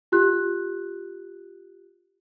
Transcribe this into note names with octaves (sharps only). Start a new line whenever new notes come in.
F4 G4 F#6